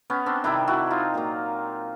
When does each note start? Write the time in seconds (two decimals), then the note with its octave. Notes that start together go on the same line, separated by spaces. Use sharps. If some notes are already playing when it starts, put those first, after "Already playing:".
0.10 B3 C#4
0.26 C4 D4
0.44 C3 D#3 G3 D4 E4
0.68 E4 F#4
0.91 D#4 F4
1.14 A#2 F#3 A#3